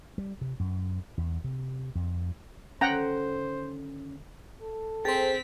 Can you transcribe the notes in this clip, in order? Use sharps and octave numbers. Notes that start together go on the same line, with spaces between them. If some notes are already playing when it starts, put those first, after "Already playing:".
G3
C3
F#2
E2
C3
F2
D3 D#3 G3 C#4 C5 F#5 G5 A#5
A4
C4 G#4 C5 G5 A6 B6